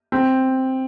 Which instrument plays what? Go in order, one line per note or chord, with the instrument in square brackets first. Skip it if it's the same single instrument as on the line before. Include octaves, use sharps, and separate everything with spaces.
[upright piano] C4